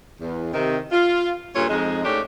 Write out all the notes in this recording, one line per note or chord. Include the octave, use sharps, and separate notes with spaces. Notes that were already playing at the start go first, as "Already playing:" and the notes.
E2
C3 D#3
F4
G2 A#2 C#3 F4 A4 C#5
F2 G#3 D#4
G#2 A3 C#4 D4 G4